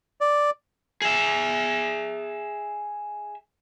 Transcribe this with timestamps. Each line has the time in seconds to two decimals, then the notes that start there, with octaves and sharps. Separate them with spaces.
0.21 D5
1.02 G#4 E5